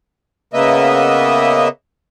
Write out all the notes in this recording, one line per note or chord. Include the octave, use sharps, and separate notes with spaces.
C#3 A#3 B3 D#5 E5